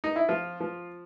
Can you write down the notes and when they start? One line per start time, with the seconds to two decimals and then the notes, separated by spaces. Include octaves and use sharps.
0.04 D#4
0.16 E4
0.29 F3 F4
0.61 F3